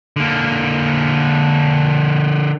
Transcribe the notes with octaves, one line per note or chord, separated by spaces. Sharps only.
D3 A#3